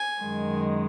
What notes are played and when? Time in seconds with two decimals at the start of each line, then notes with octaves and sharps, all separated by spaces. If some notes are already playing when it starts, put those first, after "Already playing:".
Already playing: G#5
0.21 F#2 D#3 G#3